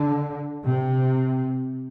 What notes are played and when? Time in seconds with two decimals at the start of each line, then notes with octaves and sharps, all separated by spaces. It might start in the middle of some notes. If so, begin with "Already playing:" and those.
Already playing: D3
0.66 C3